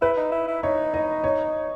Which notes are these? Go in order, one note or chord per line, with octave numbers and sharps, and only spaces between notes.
E4 B4
D#4
E4
E4
D#4 C#5
D#5
C#5